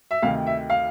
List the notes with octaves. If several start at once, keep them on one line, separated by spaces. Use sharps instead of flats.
E5
D2 C3 D#3 F5
E5
F5